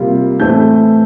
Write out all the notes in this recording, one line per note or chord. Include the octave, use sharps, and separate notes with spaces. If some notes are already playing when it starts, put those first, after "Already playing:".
Already playing: C3 G3 A#3 F4
A2 E3 A3 C4 E4 G6